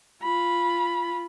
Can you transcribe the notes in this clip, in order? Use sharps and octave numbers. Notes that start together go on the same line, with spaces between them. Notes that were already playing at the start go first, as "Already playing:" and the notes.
F4 B5